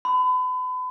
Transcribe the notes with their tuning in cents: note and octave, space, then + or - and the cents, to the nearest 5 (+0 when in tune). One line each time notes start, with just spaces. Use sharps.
B5 +35